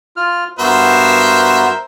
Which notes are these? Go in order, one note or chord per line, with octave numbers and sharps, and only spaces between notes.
F4 F6
G2 B3 F#4 A#4 C5 E5